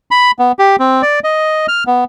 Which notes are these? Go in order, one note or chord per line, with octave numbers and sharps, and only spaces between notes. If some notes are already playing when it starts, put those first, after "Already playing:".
B5
B3
G4
C4
D5
D#5
F6
B3